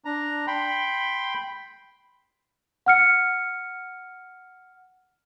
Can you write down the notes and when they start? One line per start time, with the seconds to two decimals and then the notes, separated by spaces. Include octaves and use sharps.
0.05 D4 A#5
0.47 G5 B5 C6
2.86 F#5 F6 C#7